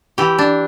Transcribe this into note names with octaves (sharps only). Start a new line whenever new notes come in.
E3 G4
D4